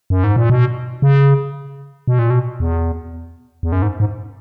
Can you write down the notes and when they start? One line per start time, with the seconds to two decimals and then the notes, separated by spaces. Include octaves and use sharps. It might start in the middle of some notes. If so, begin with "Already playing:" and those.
0.10 F#2
0.24 G#2
0.36 A#2
0.50 B2
1.02 C#3
2.08 B2
2.19 A#2
2.30 B2
2.60 E2
3.63 E2
3.72 F#2
3.82 G#2
4.00 G#2